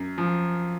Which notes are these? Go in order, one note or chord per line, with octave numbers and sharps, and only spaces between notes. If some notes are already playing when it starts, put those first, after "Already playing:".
Already playing: F#2
F3